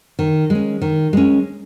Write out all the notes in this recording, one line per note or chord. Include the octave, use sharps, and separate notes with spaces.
D#3
G#3
C#4
D#3
G#3 C#4